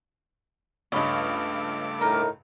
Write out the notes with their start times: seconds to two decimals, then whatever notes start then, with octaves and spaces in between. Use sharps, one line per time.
0.92 C#2 G2 A3 C#4 B4 D#5 D6
2.01 A2 D#4 A#4